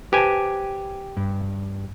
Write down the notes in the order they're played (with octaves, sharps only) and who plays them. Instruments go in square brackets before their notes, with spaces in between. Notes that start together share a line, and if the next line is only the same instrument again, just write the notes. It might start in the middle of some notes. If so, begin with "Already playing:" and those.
[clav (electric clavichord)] G4 G#5 [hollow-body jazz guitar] B4 C5 A5
[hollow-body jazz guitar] G2